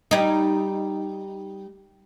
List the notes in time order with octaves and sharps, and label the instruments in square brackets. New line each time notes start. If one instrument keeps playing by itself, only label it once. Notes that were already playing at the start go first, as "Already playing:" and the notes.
[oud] G3 D#4